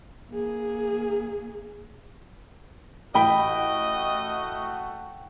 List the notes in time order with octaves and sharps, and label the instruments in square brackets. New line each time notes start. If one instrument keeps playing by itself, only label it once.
[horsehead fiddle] A#3 G#4
[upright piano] A1 B5 G7 [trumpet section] A3 F#4 F#5 [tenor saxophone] D#5 [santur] G5